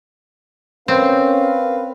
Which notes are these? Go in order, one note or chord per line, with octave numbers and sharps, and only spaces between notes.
C4 C#4 A#4 B4 F5